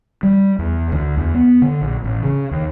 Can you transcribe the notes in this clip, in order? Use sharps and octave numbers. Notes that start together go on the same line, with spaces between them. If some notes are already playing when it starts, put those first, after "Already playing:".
G3
E2
D2
E2
B3
D3
A#1
A1
C#3
D#2